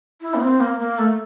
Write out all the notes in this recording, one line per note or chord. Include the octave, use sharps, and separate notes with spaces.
E4
A#3
C4
A#3
A#3
A3